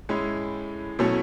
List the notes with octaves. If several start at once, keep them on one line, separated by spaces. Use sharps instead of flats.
A2 G#3 C#4 E4
B2 F#3 A3 C#4 E4